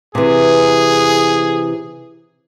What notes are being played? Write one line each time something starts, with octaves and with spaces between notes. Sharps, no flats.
C3 E3 G#4